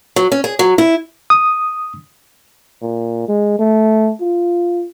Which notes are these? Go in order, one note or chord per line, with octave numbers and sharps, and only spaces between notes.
F#3
C#4
G#4
F#3
E4
D#6
A#2
G#3
A3
F4